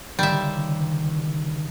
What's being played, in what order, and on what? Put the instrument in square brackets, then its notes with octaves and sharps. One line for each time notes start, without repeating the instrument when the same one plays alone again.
[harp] C#2 D3 D#3 [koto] G3 E5